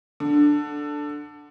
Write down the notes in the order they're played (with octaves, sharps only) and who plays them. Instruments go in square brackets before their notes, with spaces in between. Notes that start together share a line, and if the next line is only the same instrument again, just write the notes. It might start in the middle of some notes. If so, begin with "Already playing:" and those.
[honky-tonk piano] D3